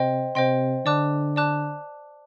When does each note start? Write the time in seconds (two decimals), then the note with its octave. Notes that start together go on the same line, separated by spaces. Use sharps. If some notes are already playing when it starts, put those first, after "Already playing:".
Already playing: C3 C5 D#5 G5 C6
0.35 C3 C5 D#5 G5 C6
0.86 D3 D5 A5 D6 F#6
1.36 D5 A5 D6 F#6